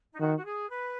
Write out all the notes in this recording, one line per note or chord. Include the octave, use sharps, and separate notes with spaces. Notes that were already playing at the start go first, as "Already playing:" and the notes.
D#4
D#3 F#4
F#4
G#4
B4